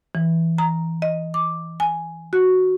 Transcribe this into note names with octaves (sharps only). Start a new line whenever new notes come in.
E3
A#5
D#5
D6
G#5
F#4